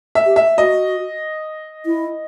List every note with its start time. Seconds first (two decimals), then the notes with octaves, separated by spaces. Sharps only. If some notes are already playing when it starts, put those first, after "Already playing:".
0.15 E5
0.26 G4
0.36 E5
0.58 F#4 D#5
1.86 E4